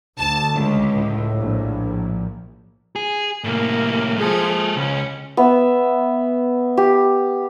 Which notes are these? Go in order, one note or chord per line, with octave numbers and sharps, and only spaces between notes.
D2 A5
C#2
A2
A#1
G#4
C2 A2 A#3
F3 G#3 G#4 A4
C#2 C#4
B3 E5
G4